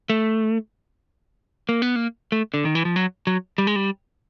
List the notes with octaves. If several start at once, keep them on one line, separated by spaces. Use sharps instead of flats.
A3
A#3
B3
A#3
A3
D3
D#3
E3
F3
F#3
F#3
G3
G#3
G3